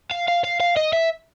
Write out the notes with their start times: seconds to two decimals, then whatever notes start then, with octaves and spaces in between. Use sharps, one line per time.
0.11 F5
0.28 F5
0.44 F5
0.60 F5
0.77 D#5
0.93 E5